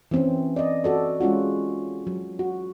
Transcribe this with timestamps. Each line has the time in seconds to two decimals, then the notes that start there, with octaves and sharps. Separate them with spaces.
0.11 E3 C4 C#4
0.56 D5 D#5
0.84 F#4 A4 D5
1.21 G#3 C#4 F4 F#4
2.07 F#3
2.39 F#4